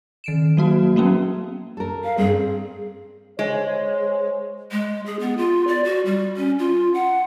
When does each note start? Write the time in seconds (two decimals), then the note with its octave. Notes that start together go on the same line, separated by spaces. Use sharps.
0.24 D#3 D7 E7
0.57 F#3 A#3 F#4
0.96 F#3 A#3 B3 C#4
1.77 A4 A#4
2.04 F5
2.17 G2 C4 G#4
3.39 G#3 C5 C#5
4.71 G#3
5.06 G#4
5.20 B3
5.37 F4
5.67 D5
5.84 F#4
6.05 G3
6.37 C#4
6.59 F4
6.94 F#5